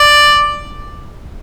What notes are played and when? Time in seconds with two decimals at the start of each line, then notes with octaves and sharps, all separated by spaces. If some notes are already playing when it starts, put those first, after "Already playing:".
Already playing: D5